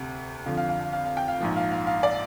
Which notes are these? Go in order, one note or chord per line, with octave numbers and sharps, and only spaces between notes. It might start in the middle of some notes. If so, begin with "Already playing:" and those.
Already playing: D2 C3
F2 D3 F3 F5
F5
F5
F5
F5
F5
G5
F5
A#1 G#2 F3
F5
F5
F5
D5